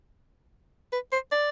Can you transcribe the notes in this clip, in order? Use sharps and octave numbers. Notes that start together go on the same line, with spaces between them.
B4
C5
D5